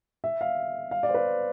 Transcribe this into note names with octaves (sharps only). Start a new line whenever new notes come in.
E5
F5
F5
D5
C5
B4